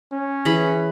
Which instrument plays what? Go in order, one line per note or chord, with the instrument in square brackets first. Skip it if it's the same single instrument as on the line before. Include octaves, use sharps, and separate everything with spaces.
[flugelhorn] C#4
[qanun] E3 G#4 B5